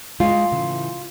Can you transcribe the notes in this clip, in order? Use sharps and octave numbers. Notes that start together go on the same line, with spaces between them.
G#3 F4 D#5
A2 C#3 E3